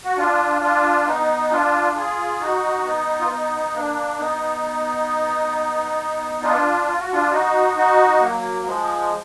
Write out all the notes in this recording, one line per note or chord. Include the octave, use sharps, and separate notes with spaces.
F#4
D4 F4
D4 F4
B3 D#4
D4 F4
F4 G#4
D#4 F#4
B3 D#4
F4
B3 D#4
A#3 D4
B3 D#4
D4 F4
F4
F#4
D4 F4
D#4 F#4
D#4 F#4
F#3 A#3
F3 G#3